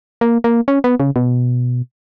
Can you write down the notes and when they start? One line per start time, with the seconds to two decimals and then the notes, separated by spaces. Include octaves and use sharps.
0.21 A#3
0.44 A#3
0.68 C#4
0.84 B3
1.00 C#3
1.16 B2